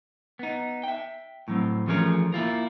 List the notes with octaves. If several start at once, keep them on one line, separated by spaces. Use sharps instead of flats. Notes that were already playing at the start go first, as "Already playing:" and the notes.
B3 D#4
E5 G5
A2 F#3 C4
E3 F3 A3 C#4 G#4 A#4
A#3 E4 F4 A#4